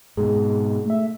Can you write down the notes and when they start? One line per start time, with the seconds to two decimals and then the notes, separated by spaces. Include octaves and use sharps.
0.17 G#2 B2 G#4
0.85 A3 E5